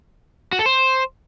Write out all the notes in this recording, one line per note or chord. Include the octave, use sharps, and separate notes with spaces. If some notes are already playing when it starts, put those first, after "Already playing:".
F#4
A4
C5